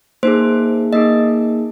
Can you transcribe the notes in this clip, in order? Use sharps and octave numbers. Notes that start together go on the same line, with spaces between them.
A#3 D#4 G#4 C5
A#3 D#4 G#4 D#5